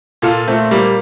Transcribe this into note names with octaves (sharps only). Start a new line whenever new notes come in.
A#2 F4 A4
A3 C4
G3 A#3